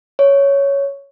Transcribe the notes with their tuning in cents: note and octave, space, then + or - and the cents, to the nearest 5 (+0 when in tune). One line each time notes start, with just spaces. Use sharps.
C#5 +5